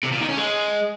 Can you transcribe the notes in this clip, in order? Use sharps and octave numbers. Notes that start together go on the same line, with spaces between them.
C3
A#2
D#3
C#4
G#3